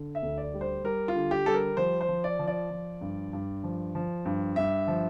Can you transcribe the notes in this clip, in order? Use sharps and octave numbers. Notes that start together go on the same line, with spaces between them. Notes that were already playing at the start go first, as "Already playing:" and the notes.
Already playing: D3
E5
D2
D5
G3
C5
G3 A#4
F4
D3
G4
G3 A4
A#4
F3 C5
C5
F3
D5
F3
D5
F3
G2
G2
F3
F3
G2
G2 E5
F3